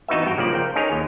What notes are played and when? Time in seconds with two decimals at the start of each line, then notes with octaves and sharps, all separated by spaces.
0.08 E3 B3 D#4 F#4 B4 E5
0.25 G#1 G2 F#4 G5 A#5
0.38 C#3 F3 A#3 D5
0.53 A#4 C5 G5
0.76 C#4 D#4 G#4 A#4 C#5
0.92 D#2